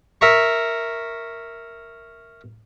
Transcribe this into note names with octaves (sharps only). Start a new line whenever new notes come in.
A#4 E5 A#5 C#6